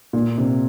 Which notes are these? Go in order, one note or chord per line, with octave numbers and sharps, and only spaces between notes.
A#2
C3